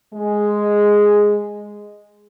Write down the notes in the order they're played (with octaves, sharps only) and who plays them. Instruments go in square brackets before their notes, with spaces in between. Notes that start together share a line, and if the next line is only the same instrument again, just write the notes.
[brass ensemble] G#3